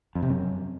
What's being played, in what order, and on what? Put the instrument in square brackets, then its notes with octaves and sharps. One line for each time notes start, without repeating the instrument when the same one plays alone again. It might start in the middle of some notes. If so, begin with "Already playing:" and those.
[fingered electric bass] F2
C3
F#2